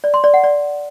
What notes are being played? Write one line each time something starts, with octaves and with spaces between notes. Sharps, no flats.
D5
C6
D5
F#5
D5